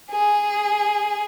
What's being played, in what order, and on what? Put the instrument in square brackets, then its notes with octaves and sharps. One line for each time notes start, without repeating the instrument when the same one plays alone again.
[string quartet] G#4